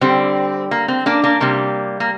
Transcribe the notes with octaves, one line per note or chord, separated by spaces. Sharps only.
D3 G3 C4
A#3
C4
A#3 D4
A#3 D4
C3 G3 A#3
A#3